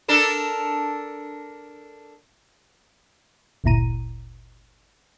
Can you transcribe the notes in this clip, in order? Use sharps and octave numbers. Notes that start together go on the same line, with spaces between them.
D4 A4 A#4
G1 D2 A#2 E4 A#5 D#7